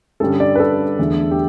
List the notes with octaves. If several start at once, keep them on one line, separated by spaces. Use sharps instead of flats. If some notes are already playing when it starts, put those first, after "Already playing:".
G2 D3 G3 C#4 A4
D5
B4
A4
E2 D3 A3
G4